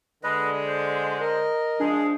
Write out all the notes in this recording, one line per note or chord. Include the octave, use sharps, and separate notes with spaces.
D3 G#3 B4 D#5
C5
A#4 D#5
F3 G#3 D4 G#4